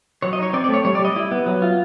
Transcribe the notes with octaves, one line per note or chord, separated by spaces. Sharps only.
F#3 C#5
D#5
D#4 C#5
C4 D5
D5
A3
C#5
G3 C#5
D5
G3
D#5
E4
B3
F#3
F4